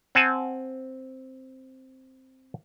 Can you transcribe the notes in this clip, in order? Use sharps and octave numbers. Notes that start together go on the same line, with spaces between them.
C4 F#5 G#5 A5